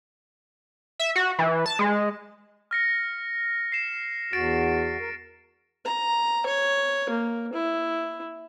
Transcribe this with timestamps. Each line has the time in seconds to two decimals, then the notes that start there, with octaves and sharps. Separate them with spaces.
0.99 E5
1.16 F#4
1.39 E3
1.66 A5
1.79 G#3
2.71 F6 A#6 C#7
3.72 C7 E7
4.33 E2 F#4 A6 D7
5.00 A#4
5.85 A#5
6.46 C#5
7.10 A#3
7.53 E4